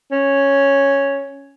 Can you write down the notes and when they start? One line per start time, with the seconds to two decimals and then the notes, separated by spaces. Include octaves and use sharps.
0.12 C#4